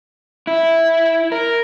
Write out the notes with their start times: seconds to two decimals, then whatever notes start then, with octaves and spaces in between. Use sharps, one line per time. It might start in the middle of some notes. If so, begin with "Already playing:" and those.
0.47 E4
1.32 A#4